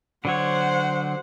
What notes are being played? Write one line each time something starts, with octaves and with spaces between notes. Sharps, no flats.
D3 F#3 C5 C#5 F#5